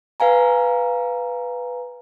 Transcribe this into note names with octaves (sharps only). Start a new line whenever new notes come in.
B4 F5 G#5 A#5